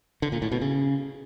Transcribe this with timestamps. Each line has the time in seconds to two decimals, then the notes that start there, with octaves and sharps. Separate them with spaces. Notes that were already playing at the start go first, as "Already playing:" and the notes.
0.22 D3
0.32 A#2
0.42 A2
0.52 B2
0.61 C#3